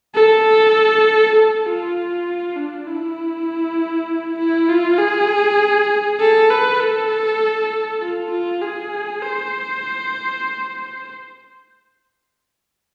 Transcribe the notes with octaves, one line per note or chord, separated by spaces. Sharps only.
A4
A4
F4
D4
E4
E4
F4
G#4
A4
B4
A4
F4
F4
G#4
C5